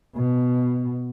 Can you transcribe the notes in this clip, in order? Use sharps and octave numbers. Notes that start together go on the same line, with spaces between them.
B2